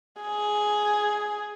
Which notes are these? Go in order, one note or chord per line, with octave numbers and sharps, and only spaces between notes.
G#4